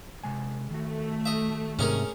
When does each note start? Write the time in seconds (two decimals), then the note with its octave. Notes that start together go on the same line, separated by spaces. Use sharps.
0.24 C3 G#3 G#5
0.71 D#3 A3 F#4
1.26 D#5 E5
1.79 G#2 C3 C#4 G#4 A#4